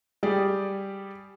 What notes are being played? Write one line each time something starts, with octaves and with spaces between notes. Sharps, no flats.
G3 G4 G#4 D5